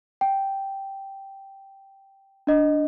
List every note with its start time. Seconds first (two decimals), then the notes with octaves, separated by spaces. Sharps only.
0.21 G5
2.47 D4 D#5